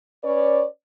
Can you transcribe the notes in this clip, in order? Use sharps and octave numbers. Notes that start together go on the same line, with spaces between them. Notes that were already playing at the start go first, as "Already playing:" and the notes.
C#4 B4 C#5 D5